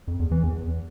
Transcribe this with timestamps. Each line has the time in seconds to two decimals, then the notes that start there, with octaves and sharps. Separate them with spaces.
0.08 F2
0.20 E2
0.32 E3
0.43 E2